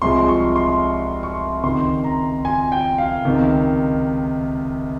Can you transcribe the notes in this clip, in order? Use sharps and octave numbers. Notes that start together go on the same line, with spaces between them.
C2 C3 F3 G#3 C6
C#6
C6
C#6
C#2 C3 D#3 C6
A#5
G#5
G5
F5
C#2 C3 D#3